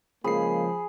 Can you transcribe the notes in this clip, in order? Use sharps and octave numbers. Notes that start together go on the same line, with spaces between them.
C#3 F3 G#3 A#3 G#4 B5 C7